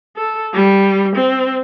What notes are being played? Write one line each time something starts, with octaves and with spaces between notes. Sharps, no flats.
A4
G3
C4